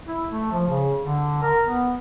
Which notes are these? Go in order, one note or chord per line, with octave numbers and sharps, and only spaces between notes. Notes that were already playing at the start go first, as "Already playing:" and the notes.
E4
A3
F3
C#3
D3
A#4
B3